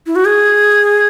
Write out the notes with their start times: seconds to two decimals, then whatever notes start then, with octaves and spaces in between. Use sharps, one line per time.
0.06 E4
0.16 F#4
0.25 G#4